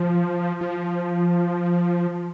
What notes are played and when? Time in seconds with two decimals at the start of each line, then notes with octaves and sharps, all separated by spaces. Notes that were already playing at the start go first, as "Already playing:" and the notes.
Already playing: F3
0.61 F3